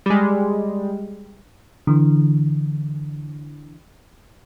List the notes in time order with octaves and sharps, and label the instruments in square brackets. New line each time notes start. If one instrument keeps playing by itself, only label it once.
[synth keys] G3 G#3
[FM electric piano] D3 E3